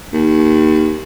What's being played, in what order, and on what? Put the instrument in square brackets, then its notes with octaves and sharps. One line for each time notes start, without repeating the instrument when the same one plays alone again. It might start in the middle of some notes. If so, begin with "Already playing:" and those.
[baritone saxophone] D#2